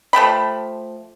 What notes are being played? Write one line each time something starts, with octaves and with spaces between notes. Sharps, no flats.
F3 A3 G4 B5